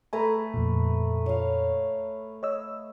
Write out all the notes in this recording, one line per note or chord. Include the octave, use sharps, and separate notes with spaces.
A3 A4 B4 G#5 A#5
F2 A#2
C#5 F5
C#5 D#5 E6